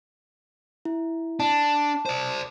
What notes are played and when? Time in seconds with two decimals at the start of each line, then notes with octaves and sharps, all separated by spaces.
0.85 E4
1.40 D4 A5
2.06 C5 D5